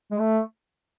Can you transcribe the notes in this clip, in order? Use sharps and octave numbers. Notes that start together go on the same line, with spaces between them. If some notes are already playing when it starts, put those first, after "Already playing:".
G#3
A3